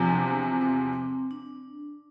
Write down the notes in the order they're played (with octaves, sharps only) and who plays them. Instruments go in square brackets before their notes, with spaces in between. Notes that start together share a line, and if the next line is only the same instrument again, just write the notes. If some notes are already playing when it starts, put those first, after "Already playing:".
Already playing: [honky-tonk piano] E2 C3 F3
[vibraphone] D4
C4
C4
C4
D4